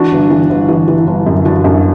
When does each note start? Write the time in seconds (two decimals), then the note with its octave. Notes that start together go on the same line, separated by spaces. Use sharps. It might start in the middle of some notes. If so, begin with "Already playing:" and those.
Already playing: E3 D4 F#4
0.12 G1
0.30 E3
0.49 G1
0.68 E3
0.88 E3
1.07 G1
1.26 F#2
1.45 E3 D4 F#4
1.64 F#2